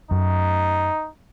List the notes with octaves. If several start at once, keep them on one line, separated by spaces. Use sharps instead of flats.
F#2 D#4